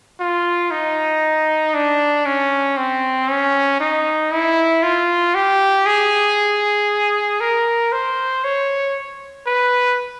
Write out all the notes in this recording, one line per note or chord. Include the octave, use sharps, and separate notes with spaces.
F4
D#4
D4
C#4
C4
C#4
D#4
E4
F4
G4
G#4
A#4
C5
C#5
B4